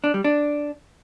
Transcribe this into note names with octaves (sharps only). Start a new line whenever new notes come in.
D4
G3
D4